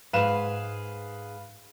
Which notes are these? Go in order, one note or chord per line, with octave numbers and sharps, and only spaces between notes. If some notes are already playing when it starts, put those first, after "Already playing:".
G#2 G#4 B4 F5 E7